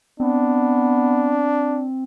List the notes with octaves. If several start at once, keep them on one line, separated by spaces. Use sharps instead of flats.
B3 C4 D4